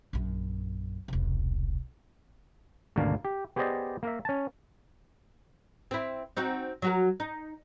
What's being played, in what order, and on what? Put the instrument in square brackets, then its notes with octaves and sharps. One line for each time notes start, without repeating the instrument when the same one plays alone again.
[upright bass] A#1 F#2
E1 C2
[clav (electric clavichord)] G#1 D2 B2 A#3 D4 F5
G4
B3 G4 G#4 C5 D5 D#5
A#3 A#4 E5
C#4 A5
[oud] C4 E4
C4 D#4 F#4
F#3 F#4 A#4
D#4